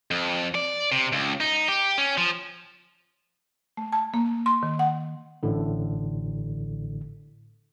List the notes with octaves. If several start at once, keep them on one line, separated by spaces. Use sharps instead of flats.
F2
D5
C3
C#2
D#4
G4
C#4
F3
A3
A5
A#3
C6
D#3
F#5
A1 A2 D3